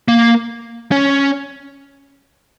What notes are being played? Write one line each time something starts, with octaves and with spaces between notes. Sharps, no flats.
A#3
C#4